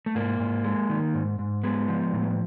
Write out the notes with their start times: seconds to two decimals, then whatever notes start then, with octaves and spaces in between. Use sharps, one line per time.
0.06 A3
0.15 G#2 A#3
0.40 G#2
0.64 G#3
0.90 D#3
1.14 G#2
1.39 G#2
1.64 G#3 B3
1.88 F3
2.13 A2